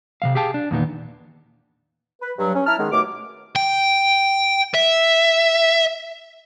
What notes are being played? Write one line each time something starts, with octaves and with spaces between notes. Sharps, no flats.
C3 D#3 F5
G4 G#4 F5 G5 A5
D4
E2 A#2 D#3 B3
B4
G2 F#3
C#4
E4 A5 A#5 F6
D#3 G#3 B3
D#2 B2 F#3 A3 D6
G5
E5